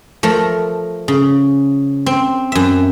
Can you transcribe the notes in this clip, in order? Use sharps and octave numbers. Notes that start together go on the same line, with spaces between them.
F3 A3 A#4
C#3
C4
F#2 E5